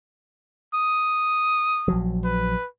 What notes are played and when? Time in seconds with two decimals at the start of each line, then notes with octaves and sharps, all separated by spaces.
0.74 D#6
1.88 A#1 F3 F#3
2.24 B4